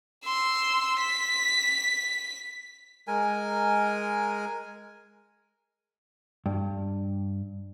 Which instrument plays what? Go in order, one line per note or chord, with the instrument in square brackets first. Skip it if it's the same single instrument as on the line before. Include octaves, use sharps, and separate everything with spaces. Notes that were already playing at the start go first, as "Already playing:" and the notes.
[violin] C6 E6
B6
[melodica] G#3 A#4 G#5
[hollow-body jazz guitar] G2